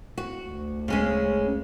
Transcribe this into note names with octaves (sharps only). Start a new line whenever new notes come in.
F#4
D2
C#3 G#3 C#4